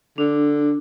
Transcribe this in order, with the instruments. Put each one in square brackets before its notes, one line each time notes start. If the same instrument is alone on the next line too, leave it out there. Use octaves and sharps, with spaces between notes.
[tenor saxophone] D3 [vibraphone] D4